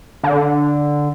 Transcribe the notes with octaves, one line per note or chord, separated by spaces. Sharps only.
D3